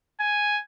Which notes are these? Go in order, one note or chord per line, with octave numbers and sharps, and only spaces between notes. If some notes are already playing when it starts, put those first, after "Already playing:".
G#5